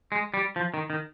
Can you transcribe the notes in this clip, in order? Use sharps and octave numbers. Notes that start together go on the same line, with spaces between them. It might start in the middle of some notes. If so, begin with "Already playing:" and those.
G#3
G3
F3
D#3
D#3